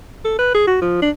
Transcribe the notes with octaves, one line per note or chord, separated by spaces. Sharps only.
A4
B4
G#4
F#4
F3
D4